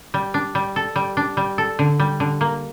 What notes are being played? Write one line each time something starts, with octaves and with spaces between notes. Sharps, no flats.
G3
D4
G3
A4
G3
D4
G3
A4
D3
G3
D3
A#3